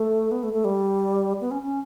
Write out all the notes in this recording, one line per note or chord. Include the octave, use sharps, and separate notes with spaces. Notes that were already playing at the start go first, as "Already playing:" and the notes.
Already playing: A3
B3
A3
A3
G3
B3
C#4
C#4